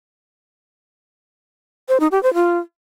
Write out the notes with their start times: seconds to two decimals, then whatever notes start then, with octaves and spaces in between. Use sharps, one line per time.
1.89 C5
2.00 D#4
2.12 G4
2.23 C5
2.34 F4